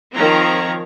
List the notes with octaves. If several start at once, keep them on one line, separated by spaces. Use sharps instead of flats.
D#3 F3 C4 C#5 A#5